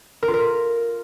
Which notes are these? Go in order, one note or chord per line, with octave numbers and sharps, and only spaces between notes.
A#4
F4
A#4